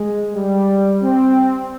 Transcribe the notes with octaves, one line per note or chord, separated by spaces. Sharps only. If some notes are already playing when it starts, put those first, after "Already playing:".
Already playing: G#3
G3
C4